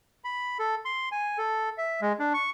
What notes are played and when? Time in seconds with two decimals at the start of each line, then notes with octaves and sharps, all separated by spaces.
0.24 B5
0.59 A4
0.85 C6
1.12 G#5
1.38 A4
1.78 E5
2.01 G#3
2.20 D4
2.34 C#6